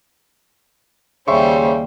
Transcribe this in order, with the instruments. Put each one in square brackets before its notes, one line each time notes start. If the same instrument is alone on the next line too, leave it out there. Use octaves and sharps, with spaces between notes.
[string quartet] D#2 G3 C5 [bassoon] C#3 [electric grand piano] E5 C6 C#6